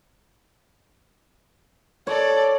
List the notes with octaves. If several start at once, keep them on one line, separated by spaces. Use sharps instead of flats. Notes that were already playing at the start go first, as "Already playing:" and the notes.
A4 C#5 D5